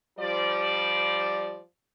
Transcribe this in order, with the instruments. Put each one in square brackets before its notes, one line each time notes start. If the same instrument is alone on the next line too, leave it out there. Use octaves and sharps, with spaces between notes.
[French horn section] F3 G3 D5